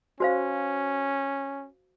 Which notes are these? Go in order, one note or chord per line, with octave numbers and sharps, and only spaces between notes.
C#4 F#4 C5 F5